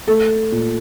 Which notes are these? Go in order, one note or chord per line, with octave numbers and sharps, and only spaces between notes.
A3 A4
A#2